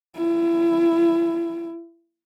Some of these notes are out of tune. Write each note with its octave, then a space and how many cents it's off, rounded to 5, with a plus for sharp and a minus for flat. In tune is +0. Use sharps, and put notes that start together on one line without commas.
E4 +30